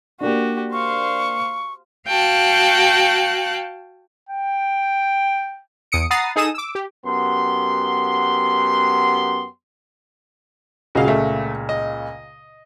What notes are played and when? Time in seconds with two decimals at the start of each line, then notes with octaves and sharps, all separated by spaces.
0.21 A#3 D4 F#4 G4
0.72 C5 F5 C#6
2.07 F#4 F5 G5 A5 F#6
4.29 G5
5.92 E2 D#6 C#7 D7
6.10 F#5 A#5 B5 D#6 A6 C7
6.36 D#4 G#4 A4 D#6 E7
6.54 D6 E6
6.75 G4
7.05 F#2 B3 G4 C6
10.95 C#2 A#2 C#3 F#4 D#5 F5
11.08 A3
11.69 D#5